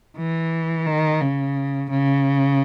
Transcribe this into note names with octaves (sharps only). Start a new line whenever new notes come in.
E3
D#3
C#3
C#3